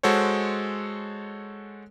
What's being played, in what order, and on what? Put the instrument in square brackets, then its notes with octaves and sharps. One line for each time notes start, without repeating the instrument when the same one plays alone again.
[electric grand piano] G#3 F#4 A4 C5 C#5